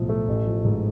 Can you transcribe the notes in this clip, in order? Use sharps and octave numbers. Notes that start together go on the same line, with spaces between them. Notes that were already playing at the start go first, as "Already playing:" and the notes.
Already playing: B1 A2 F3
A3
A1
F3
G#2